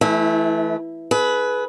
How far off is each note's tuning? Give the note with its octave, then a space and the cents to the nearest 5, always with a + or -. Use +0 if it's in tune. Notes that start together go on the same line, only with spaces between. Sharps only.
E3 +0 A3 -20 E4 -40
G#4 +35 B4 +0